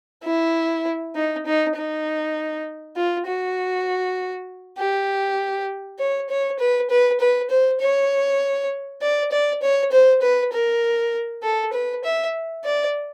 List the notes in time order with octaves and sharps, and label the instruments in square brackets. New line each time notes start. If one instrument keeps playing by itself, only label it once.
[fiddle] E4
D#4
D#4
D#4
F4
F#4
G4
C#5
C#5
B4
B4
B4
C5
C#5
D5
D5
C#5
C5
B4
A#4
A4
B4
E5
D5